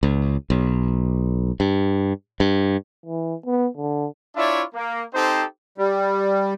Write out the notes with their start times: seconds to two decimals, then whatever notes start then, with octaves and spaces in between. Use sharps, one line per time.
0.03 C#2
0.50 B1
1.60 G2
2.40 G2
3.06 E3
3.46 B3
3.77 D3
4.36 D4 E4 F4 C#5 D5 E5
4.74 A#3
5.14 C4 D#4 G4 A4 C5
5.78 G3